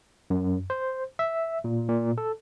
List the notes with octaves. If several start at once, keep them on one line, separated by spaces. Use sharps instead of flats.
F#2
C5
E5
A#2
A#2
A4